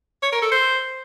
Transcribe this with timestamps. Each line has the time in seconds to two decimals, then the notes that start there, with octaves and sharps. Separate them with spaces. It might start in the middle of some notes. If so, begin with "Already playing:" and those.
0.23 C#5
0.32 A#4
0.42 A4
0.52 C5